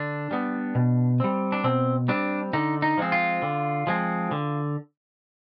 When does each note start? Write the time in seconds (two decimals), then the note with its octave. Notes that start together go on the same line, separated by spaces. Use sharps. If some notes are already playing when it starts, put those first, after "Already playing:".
Already playing: D3 D4
0.31 G3 B3
0.75 B2
1.20 G3 C4
1.52 D4
1.64 B2 C4
2.08 G3 C4 D4
2.53 D3 D#4
2.82 D#4
2.97 F3 G#3 C4
3.12 F4
3.42 D3
3.87 F3 G#3 C4
4.31 D3